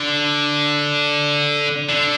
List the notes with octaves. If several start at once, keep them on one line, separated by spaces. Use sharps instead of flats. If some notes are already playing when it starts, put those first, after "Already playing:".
Already playing: D3
D3